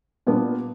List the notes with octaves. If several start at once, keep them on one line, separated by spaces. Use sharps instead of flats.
A#2 G3 B3 D4